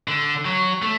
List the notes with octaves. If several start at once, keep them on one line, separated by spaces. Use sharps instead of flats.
D3
F#3
A3